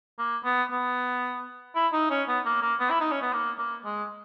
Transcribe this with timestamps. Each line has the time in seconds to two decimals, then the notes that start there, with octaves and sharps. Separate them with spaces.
0.19 A#3
0.44 B3
0.71 B3
1.76 E4
1.93 D#4
2.10 C#4
2.28 B3
2.46 A#3
2.62 A#3
2.80 B3
2.90 E4
3.01 D#4
3.12 C#4
3.22 B3
3.33 A#3
3.59 A#3
3.85 G#3